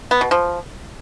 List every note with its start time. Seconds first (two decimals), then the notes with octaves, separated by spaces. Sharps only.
0.11 B3
0.21 B2
0.31 F3